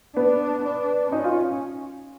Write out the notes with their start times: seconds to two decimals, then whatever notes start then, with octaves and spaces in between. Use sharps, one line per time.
0.17 B3 D4
0.64 D4
1.12 C#4 D#4
1.24 F4